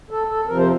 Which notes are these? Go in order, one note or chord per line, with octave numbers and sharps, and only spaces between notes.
A4
A4
F2 C3 F3 A#4
C5